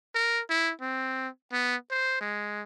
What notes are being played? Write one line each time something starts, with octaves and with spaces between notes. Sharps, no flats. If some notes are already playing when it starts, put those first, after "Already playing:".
A#4
E4
C4
B3
C5
G#3